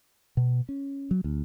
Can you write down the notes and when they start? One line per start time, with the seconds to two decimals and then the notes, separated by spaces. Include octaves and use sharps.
0.37 B2
0.69 C#4
1.11 F#3
1.24 D2